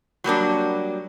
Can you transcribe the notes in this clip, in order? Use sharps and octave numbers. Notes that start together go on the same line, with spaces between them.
F#3 G3 A#3 D4